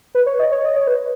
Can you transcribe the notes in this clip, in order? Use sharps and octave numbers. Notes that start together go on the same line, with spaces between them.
B4
C#5
D#5
C#5
D#5
C#5
B4